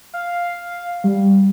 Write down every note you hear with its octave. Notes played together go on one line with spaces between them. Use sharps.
F5
G3